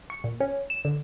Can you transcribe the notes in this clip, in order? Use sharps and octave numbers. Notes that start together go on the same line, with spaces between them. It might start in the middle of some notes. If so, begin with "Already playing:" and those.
C#6
A#2
C#4
E7
D3